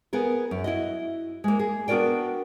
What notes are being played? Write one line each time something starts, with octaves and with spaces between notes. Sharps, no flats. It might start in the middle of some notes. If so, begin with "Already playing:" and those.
B3 G#4 A#4
F#2
E4 F#4 D#5
G#3 A#3
G#4
B3 D4 F#4 A#4 D5 G5